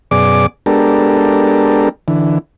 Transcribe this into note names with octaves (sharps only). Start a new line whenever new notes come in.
F#2 B2 G#4 D5 D6
G#3 B3 D4 G4 A4 A#4
D3 E3